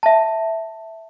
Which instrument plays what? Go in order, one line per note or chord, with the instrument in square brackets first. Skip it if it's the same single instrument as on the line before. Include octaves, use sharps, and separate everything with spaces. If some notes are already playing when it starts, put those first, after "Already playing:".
[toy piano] E5 A5